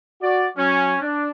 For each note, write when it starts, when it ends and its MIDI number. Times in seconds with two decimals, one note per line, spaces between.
0.22 0.47 66
0.22 0.47 74
0.58 0.96 54
0.58 0.96 61
1.01 1.30 62